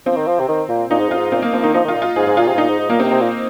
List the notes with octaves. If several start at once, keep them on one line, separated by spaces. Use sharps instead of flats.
F3 C4
D#3
F3
C3
D#3
A#2
A#2 D#4
G#2
F2 F4
G#2
A#2 C4
A#3
F3 C4
D#3 D#4
F3 D#4
D#3
F4
A#2
F4
G#2 G#4
G#2
A#2 F4
C3
G#2
A#2 D#4
G#2
G#2
A#2 A#3
C3 C4
C3
A#2